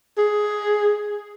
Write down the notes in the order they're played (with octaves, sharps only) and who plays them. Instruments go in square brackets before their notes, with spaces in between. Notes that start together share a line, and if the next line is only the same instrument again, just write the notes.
[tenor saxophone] G#4